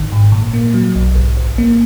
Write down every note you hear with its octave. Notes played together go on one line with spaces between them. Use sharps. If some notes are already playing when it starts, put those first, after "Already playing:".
Already playing: G#1 D#3
G#2
A#2
A#3
F#3
B1
G#1
G#1
A#3